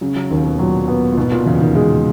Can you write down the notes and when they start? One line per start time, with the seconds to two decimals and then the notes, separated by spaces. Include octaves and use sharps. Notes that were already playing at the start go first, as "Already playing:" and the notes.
0.01 C#3 F#3
0.16 F#3
0.30 D#2 D#3
0.45 B2
0.59 A#2 F#3
0.88 B3
1.12 A#2
1.17 G#2 B2
1.32 A#2
1.46 E2 C#3
1.60 D#3
1.75 C#3 G#3